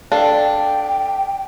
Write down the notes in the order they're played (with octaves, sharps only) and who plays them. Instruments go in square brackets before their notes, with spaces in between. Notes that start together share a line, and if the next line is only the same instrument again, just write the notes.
[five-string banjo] D4 [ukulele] A4 F5 A5 [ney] G5